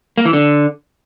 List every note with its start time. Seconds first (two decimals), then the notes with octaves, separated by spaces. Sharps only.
0.18 A#3
0.25 E3
0.33 D3